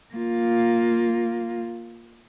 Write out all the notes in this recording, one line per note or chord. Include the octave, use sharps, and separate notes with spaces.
A#3 F4